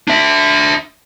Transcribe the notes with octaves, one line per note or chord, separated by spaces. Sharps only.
D4 E5